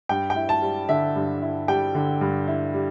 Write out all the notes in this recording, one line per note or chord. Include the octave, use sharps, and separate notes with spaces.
G2 G5
G5
E4
A5
G3
D3 E5
G2
E4
G3 G5
D3
G2
E4
G3